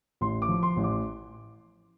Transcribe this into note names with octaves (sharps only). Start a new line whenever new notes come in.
A1 C6
D6
F3
C6
A1
D6